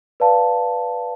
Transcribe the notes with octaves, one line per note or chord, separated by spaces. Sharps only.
B4 D5 F5 A5